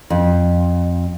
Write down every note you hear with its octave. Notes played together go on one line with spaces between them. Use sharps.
F2